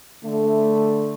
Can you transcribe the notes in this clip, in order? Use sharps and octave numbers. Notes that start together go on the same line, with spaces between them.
D3 A3